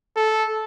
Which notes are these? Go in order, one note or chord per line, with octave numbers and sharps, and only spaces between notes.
A4